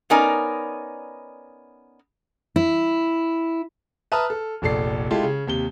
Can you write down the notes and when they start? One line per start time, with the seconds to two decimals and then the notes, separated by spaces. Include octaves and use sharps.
0.10 B3 C#4 D#4 A#4 D5 G#5
2.56 E4
4.12 B4 E5 A5 A#5 D#6 F6
4.30 A4
4.62 F1 A#1 A4 D5 C7
5.11 G#3 E4 F4 G4 A4
5.23 C#3
5.47 D#2 C3 G7